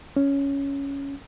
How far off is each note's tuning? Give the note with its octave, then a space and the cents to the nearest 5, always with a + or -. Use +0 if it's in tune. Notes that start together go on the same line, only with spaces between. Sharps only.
C#4 +10